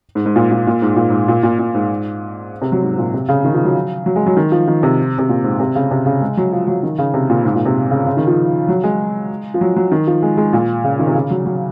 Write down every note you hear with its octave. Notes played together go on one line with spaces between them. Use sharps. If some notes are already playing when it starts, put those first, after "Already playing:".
G#2
G#2
A#2
A#2
A#2
G#2
A#2
G#2
A#2
A#2
A#2
G#2
C3
F#3
G#2
A#2
C3
C#3
D#3
F3
F#3
F#3
G#3
F#3
D#3
F3
D#3
C3
C3
A#2
G#2
C3
C#3
C3
C#3
G#3
F#3
F3
F#3
D#3
C#3
C3
A#2
G#2
A#2
C3
C#3
C#3
D#3
F3
F#3
G#3
F3
F#3
F#3
D#3
F3
G#3
G#3
A#2
C#3
D#3
C3
C#3
F#3
F#3